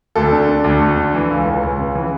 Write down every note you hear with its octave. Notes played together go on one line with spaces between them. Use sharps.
D2 A4
D3
D3
D2
D2
D3
E3
C#2
C#2
C#2
C#3
E3